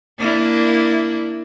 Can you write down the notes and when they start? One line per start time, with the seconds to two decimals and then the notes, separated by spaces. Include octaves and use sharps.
0.18 A#3 D4 E4